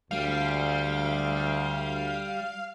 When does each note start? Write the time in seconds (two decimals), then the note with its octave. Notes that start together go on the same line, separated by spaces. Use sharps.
0.11 D2 G3 F5